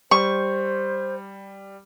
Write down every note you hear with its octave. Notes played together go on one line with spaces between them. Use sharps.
G3 C5 C#6